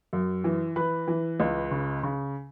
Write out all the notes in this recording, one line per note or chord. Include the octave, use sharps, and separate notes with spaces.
F#2
E3
E3 B4 B5
E3
C#2
C#3
C#3